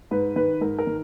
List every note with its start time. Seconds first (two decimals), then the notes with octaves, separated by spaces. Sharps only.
0.11 G#2 B4
0.36 D#3 B4
0.61 G#2 A#4
0.79 A#4
0.87 D#3